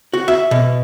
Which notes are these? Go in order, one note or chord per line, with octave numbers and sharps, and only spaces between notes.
F#4
E5
B2